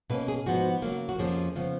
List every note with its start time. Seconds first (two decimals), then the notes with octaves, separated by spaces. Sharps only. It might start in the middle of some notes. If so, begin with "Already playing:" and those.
0.10 B2 A#3 C#4 B4
0.28 G#4
0.46 G#2 F3 B3 F#4
0.82 C#3 F#3 A#3
1.09 F#4
1.18 F2 F3 A#3 C#4 G#4
1.56 C#3 F3 B3